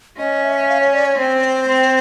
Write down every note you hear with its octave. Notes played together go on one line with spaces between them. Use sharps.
C#4 D#5
E5
F5
C#5
D5
C#5
C4 C5
C4